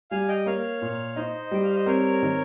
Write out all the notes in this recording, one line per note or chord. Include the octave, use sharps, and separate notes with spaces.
G3 F5 G#5
D#5 G5
A#3 C#5 F5
A#2
D#4 C5 D#5
G3 G5
F5
D#5
C4 A#4 C#5
D#3